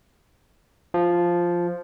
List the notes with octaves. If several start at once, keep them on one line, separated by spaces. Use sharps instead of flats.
F3